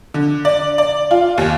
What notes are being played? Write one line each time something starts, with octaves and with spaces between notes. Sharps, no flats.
D3
D5
D5
F4
D#2